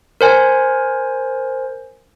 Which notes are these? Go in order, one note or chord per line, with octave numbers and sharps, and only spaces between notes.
A#4 C5 G#5